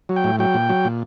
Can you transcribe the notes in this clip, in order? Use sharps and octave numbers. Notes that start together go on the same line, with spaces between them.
F#3
G5
A2
F#3 G5
A#2
F#3
A#2